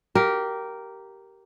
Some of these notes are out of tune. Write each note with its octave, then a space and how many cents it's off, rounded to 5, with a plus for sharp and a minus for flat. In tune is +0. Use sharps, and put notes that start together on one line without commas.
G4 -15 A#4 +0 F5 +0